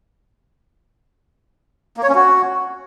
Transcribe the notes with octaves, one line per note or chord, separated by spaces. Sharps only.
A#3
C#5
C#4
F#4